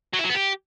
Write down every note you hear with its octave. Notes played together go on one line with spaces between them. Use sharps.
F#3
E4
F#3
B3
G4